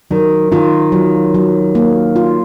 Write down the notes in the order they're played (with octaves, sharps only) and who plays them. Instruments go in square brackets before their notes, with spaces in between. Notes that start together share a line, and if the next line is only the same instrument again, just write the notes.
[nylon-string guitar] D#3 [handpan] F#3
[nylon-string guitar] D#3 [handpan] F4
[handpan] F#3
F#3
A#3
F4